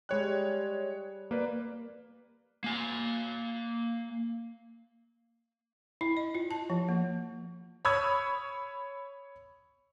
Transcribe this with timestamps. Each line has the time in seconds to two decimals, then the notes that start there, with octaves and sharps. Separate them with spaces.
0.09 G3 G#3 C#5 F#6
1.31 A#3 B4 D5
2.64 A#3 G#5
6.01 E4
6.17 D#5
6.35 F4
6.51 A5
6.70 F3
6.89 A#3
7.85 C#5 B5 C#6 D#6 E6 G#6